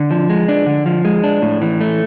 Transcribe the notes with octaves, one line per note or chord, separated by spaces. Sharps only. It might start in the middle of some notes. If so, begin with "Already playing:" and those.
Already playing: D3
F3
G#3
D4
D3
F3
G#3
D4
A2
E3
A3